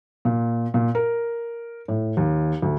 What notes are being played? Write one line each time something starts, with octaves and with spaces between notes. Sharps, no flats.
A#2
A#2
A#4
A2
D#2
D2